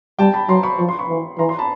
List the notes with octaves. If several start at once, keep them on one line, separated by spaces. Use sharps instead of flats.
G3 G5 A5
A5 B5
F#3 A#5 C6
B5 C#6
F3 C#6
C6
B5 C#6
E3
E3 A#5 C6
A#5 C6
A5 B5